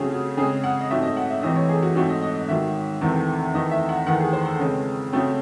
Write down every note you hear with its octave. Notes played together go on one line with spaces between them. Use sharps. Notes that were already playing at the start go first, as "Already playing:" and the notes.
Already playing: C#3 F#3 A3 C4 G#4
F#4
C#3 G#3 C4 G#4
F#5
D#5
G#2 F#3 A3 C4 E5
D#5
F#5
E5
C3 E3 A3 C4 D#5
C#5
G#4
F#4
G#2 F#3 A3 C4 F#4
D#5
D#5
D#5
G#2 D#3 F#3 E5
E2 C3 D#3 A3 C4
E2 D#3 A3 D#5
E5
F#5
E2 D#3 A3 F#5
G#4
C5
A4
C#3 G#3 C4
C#3 F#3 A3 C4